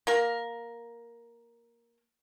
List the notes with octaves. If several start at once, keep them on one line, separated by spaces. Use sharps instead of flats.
A#3 A#4